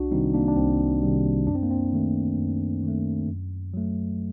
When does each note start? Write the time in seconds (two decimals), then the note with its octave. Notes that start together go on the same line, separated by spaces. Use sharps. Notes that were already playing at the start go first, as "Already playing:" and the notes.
Already playing: C2 D4 F#4
0.11 C3 D#3 G3 C4 D#4
0.34 A#3 D4
0.48 D4
0.56 C2 C4
1.02 C3 D#3 G3
1.47 F#2 D4
1.55 C4
1.63 A#3
1.71 C4
1.93 D#3 A3
2.38 F#2
2.83 D#3 A3
3.28 F#2
3.74 F#3 A3